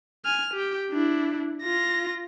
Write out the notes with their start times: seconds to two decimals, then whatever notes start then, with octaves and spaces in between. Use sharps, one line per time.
0.25 G#5 F6
0.54 G4 G5
0.91 D4 E4
1.62 F4 A#6